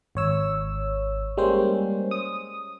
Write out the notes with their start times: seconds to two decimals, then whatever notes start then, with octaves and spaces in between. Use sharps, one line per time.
0.15 G#1 C#5 E6
1.37 G3 G#3 A#3 C#4 C5
2.11 D#6